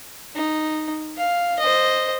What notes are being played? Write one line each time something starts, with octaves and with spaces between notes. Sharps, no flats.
D#4
F5
C5 D#5